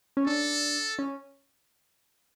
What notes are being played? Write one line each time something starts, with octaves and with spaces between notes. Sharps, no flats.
C#4
D4 A4
C#4